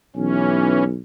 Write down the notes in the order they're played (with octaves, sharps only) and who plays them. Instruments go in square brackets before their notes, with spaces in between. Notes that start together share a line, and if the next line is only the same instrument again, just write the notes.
[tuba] B1 [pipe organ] E3 C#4